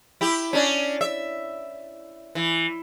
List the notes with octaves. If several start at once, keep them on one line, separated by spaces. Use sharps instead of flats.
E4 G4
C#4 D4
E5
E3